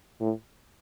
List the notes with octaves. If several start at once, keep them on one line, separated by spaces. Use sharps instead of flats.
A2